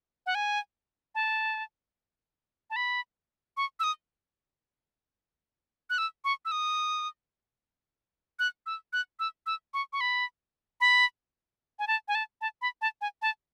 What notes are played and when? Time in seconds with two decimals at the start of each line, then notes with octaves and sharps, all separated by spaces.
0.26 F#5
0.35 G#5
1.15 A5
2.70 A5
2.76 B5
3.57 C#6
3.80 E6
3.84 D#6
5.90 F#6
5.98 E6
6.24 C#6
6.45 E6
6.52 D#6
8.39 F#6
8.66 E6
8.93 F#6
9.19 E6
9.46 E6
9.74 C#6
9.93 C#6
10.01 B5
10.81 B5
11.79 G#5
11.87 A5
12.08 G#5
12.15 A5
12.41 A5
12.62 B5
12.81 A5
13.01 G#5
13.22 A5